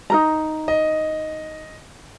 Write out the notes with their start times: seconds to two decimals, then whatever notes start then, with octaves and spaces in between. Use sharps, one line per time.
0.10 D#4 A#4 A#5
0.68 D#5